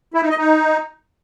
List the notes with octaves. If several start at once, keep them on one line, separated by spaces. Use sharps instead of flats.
E4
D#4
D#5
D#4